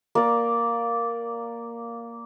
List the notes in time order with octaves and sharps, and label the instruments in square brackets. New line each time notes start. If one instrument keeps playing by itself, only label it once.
[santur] A#3 D5